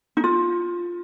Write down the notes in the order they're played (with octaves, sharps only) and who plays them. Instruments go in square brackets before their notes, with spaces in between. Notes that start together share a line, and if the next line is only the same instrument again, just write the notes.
[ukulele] D#4
F4